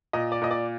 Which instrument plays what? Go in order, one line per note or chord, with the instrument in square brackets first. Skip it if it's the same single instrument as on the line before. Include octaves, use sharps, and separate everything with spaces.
[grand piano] A#2 D#5
D5
A#2 D#5
D5